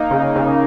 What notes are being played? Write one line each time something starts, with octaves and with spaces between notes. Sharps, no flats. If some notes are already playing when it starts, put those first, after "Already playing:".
Already playing: A#3 D#4
C#3
C#3